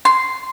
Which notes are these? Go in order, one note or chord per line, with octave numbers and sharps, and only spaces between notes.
C6